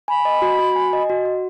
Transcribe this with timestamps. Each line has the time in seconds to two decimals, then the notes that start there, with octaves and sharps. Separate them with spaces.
0.08 G#5 B5
0.25 D#5
0.42 F#4
0.59 F#4
0.76 G#5
0.93 D#5
1.10 F#4
1.25 F#4